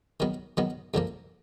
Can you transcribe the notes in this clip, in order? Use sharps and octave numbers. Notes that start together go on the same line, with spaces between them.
D#3 F#3 B3
D#3 F#3 B3
F#2 D3 F3 A#3